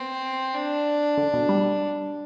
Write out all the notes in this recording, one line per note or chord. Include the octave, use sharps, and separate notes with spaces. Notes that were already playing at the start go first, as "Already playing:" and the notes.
Already playing: B3 C4
D4
D3
B2
G3